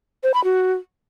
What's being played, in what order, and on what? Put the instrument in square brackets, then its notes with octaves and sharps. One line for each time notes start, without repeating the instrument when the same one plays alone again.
[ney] C5
B5
F#4